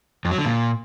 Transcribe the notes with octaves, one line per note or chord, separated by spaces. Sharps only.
F2
F#3
D3
A#2